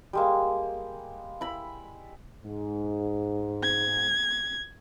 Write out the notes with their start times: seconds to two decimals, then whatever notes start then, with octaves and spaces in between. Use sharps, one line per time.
0.13 G3 G#3 A#3
1.41 E4 B5
2.45 G#2
3.63 G#6